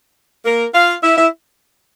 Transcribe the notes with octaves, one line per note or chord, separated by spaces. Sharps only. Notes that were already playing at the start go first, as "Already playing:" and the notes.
A#3 A#4
F4 F5
E4 E5
E4 E5